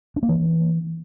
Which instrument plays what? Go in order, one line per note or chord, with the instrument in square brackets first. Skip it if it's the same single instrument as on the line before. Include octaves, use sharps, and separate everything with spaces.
[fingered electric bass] D4
A#3
E3